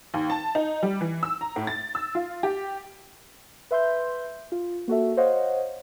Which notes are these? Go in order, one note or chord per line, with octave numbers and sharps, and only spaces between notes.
D#2
A5
D#4
G3
E3
E6
A#5
A2
A6
E6
F4
G4
B4 E5 C6 G6
F4
A#3 F#4 A4 E5
C5 C#5 D#5 F5 F#5